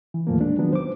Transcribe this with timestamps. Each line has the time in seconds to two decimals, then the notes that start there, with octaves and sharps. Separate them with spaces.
0.14 E3
0.27 E2 A2 D#3 F3 A3 A#3
0.41 G#3 D4
0.58 D#3 F3 F#3 B3 D4
0.73 C5 D6